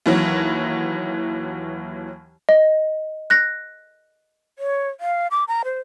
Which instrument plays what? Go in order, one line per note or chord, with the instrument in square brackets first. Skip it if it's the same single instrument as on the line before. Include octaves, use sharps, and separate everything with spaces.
[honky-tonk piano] D#2 E3 F#3
[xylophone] D#5
F#6 A#6
[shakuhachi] C#5
F5
D6
A#5
C5